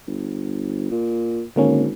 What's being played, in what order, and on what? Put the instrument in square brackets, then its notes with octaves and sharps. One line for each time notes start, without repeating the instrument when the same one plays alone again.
[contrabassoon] G1
A#2
[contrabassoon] G#1 [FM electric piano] D3 A#3 C#4